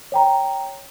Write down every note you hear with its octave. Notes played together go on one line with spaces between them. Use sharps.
C#5 G5 A#5